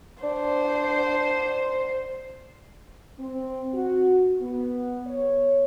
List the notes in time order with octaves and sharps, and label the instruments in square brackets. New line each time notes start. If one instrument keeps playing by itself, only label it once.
[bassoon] D4 [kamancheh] C5
[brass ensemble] C4
F#4
B3
C#5